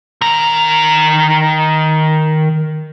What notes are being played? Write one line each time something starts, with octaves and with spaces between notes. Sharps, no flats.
D#3 A#5